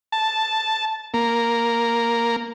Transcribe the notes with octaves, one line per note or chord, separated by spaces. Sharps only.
A5
A#3